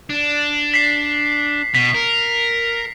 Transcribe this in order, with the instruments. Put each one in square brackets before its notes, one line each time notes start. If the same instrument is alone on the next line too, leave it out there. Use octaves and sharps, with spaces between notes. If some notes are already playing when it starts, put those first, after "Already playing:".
[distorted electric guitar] D4
[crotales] B6 C7
[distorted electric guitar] B2 [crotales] B6
[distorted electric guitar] A#4